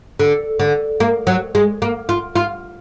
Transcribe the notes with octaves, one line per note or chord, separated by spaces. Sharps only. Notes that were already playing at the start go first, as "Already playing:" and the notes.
D3
D3
A#3
F#3
G#3
A#3
F4
F4